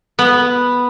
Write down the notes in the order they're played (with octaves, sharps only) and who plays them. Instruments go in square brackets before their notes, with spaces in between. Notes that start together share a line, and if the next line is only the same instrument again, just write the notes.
[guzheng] B3